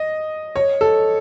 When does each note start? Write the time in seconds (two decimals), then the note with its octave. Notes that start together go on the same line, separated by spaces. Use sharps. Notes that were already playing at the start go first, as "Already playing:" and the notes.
Already playing: D#5
0.56 C#5
0.81 A4